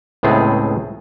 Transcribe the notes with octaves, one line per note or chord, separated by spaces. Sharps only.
C#2 A2 B3 C4 G#4